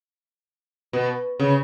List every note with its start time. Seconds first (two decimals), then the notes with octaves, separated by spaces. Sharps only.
0.93 B2
1.40 C#3